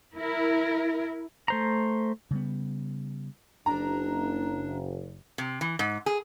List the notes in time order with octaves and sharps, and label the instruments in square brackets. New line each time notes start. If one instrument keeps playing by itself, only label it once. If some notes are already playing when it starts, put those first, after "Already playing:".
[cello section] E4 A#4
[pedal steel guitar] A3 C5 A#5
[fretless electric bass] C#3 G3 B3
[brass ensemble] F#1 [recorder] D4 [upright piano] A#5
[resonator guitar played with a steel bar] C3
E3
G#2
G#4